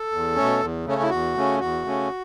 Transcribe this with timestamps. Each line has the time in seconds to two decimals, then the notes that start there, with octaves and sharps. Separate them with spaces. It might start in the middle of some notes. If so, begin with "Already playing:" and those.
Already playing: A4
0.12 E2
0.36 B2 A3 C#4
0.61 E2
0.85 C#3 A3 C#4
0.96 C#4
1.03 E4
1.10 E2 F#4
1.35 C#3 A3 C#4
1.59 E2 F#4
1.84 C#3 A3 C#4